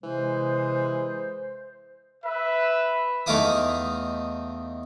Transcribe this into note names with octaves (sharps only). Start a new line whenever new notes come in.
C3 E3 G#3 C5
B4 E5
E2 A3 D#4 F5 D6 D#6